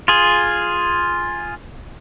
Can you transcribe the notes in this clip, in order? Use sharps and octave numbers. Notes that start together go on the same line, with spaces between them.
F4 G#4